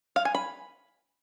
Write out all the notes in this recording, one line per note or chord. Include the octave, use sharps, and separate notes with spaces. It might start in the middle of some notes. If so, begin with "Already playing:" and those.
F5
G#5
B5